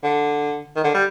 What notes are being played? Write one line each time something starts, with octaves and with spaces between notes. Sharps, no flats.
D3
D#3
D3
G3